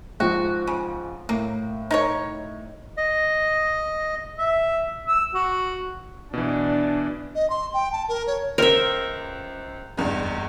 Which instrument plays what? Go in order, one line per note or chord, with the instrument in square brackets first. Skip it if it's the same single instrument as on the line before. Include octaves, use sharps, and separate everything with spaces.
[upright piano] G#2 F3 G5 [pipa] F#4
[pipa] C#3
[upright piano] A2 [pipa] A#3
[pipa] D#4 A#4 C#5
[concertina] D#5
[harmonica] E5
E6
F#4
[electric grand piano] B2 E3 [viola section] D4
[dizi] D#5
C6
G5
A5
A#4
C#5
[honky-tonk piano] C#2 C5 [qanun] A#4 E5
[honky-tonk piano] F#1 E2 G2